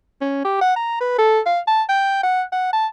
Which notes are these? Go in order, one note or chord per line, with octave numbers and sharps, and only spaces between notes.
C#4
G4
F#5
A#5
B4
A4
F5
A5
G5
F#5
F#5
A5